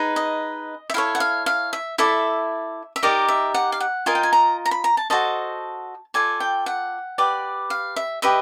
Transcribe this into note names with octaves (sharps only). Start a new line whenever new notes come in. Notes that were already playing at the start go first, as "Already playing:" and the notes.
Already playing: D#4 G#4 B4
D#5
E5
E4 A4 C#5 F5
F#5
F5
F5
E5
E4 A4 D5 E5
E5
D#4 G4 A#4 D5 D#5
E5
F#5
F5
F#5
F4 A#4 D#5 G#5
G5
G#5
A#5
A#5
B5
A#5
A5
F#4 A4 C5 D#5 A5
F4 A4 D5 G#5
G5
F#5
G4 B4 D5
F5
E5
G4 B4 D#5 E5